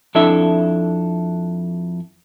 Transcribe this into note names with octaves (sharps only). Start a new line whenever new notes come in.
F2 D4 E4 A4 E5